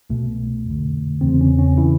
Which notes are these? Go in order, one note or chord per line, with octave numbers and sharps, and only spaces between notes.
C2 B2 A3
F2 D3
E2 C#3 E3 C4
C#4
C#4
C#3 E3 E4